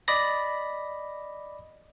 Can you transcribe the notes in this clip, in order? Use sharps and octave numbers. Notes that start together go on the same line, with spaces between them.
D5 D#5 B5 A#6